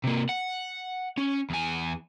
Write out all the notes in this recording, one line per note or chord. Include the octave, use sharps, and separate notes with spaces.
C3 A#3
F#5
C#4
E2 G#5